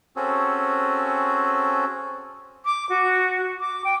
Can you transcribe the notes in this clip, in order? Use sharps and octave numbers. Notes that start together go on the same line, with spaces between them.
C4 C#4 F#4 G#4 A4
D6
F#4
D6
G5